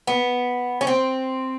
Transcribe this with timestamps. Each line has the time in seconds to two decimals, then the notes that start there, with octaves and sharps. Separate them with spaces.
0.07 B3
0.81 C#4
0.87 C4